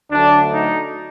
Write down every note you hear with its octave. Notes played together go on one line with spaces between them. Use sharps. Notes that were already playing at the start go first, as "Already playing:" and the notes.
D2 D3 F#3 A3 D4
D#4